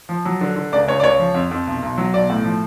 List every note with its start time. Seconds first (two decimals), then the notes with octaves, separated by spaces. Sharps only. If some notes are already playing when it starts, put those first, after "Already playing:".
0.09 F3
0.25 F#3
0.41 D3
0.56 D3
0.72 C#2 D5
0.87 C#2 C#5
1.00 D5
1.03 C#2 C#5
1.19 F3
1.34 F2
1.51 F2
1.67 B1
1.83 B1
1.98 F#3
2.14 B1 D5
2.30 A2
2.44 F3